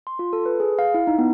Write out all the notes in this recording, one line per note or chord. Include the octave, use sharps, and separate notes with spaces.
C6
F4
A4
B4
G#4
F5
E4
D#4
B3